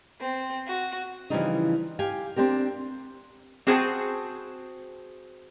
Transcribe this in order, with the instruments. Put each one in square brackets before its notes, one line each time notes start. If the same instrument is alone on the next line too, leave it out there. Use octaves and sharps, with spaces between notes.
[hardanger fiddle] C4
F#4
[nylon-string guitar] C#3 E3 F3 G3 D4 D#4
G4 F5 G#5
C4 D4 G4 A#4
[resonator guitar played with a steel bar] C4 F#4 G#4 C5 A5